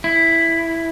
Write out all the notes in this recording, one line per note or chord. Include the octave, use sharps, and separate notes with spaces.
E4